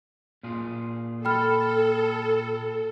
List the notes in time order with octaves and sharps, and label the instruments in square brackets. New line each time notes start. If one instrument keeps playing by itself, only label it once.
[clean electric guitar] A#2 F4 G#4
[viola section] A4 [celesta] G5 B5 F6